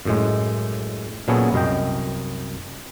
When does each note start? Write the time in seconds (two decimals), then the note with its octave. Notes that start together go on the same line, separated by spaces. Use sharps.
0.05 F#2 A2 G#3
1.28 A#2 F#3 B3 C#4 G#4 A4
1.53 C2 F#2 D#5 G5